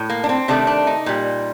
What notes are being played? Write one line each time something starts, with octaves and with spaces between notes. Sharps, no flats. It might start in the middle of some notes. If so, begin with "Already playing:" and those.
Already playing: A2
A#3
D4
C4
C3 D#3 A3 D4
D4
D#4
A#2 G3